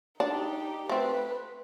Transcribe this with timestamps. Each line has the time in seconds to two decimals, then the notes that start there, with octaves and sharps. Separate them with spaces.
0.20 D4 D#4 G4
0.89 A3 C4 B4